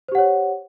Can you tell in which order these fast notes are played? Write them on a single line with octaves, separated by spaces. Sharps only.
C5 G4 F#5 C#5